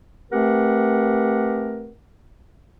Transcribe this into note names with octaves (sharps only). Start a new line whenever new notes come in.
A3 C4 G4 A#4 B4 F#5